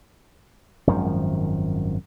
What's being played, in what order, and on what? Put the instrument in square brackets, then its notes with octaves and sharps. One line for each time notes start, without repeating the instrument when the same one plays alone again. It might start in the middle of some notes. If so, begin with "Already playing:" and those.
[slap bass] G#1 F#2 D#3 F3